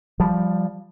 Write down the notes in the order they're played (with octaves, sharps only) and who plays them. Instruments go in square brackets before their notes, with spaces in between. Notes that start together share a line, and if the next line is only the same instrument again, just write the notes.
[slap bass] F3 G3